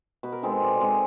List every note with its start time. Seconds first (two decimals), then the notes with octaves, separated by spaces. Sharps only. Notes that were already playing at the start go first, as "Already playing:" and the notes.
0.23 B2 B4
0.32 A#4
0.43 G#3 C4 D#4 A4
0.52 C5
0.62 B2 D5
0.74 D5
0.81 G#3 C4 D#4